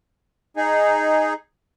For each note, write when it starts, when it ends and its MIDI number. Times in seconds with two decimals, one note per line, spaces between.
0.57 1.33 63
0.57 1.33 68